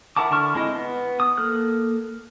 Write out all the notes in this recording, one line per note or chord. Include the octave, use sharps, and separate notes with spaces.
E4 A#4 F#5 A5 D6
D3 E4 A5 C#6 F6
G#3 C4 E4 D#5
B3
D#6
A#3 A4 F6 F#6